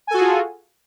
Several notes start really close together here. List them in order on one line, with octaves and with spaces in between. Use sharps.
G#5 A4 F#4 G#4 F4